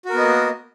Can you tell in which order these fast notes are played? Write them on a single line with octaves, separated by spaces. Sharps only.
F#4 A#4 B3 D#5 A#3